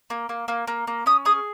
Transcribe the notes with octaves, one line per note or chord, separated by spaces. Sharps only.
A#3
A#3
A#3
A#3
A#3
C#4 D#6
G#4 D#6